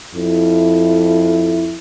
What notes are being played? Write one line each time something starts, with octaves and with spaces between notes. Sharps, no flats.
F2 E4